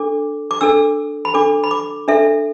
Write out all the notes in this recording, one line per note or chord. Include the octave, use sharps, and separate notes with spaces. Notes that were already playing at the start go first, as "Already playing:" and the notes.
Already playing: D4 A4 D6
D6
D4 A4 E6
B5
D4 A4 D6
B5
D6
D4 A4 E5